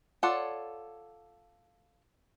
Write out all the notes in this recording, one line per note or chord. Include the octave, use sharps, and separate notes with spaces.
F4 A4 C#5 D5 F#5